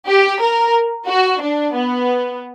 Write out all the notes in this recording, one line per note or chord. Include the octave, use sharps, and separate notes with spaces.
G4
A#4
F#4
D4
B3